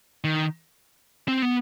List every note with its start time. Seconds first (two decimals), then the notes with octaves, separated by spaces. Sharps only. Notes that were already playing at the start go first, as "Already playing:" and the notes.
0.24 D#3
1.28 C4
1.42 B3